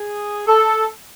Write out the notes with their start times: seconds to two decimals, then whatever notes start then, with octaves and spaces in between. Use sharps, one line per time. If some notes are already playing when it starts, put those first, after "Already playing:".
Already playing: G#4
0.47 A4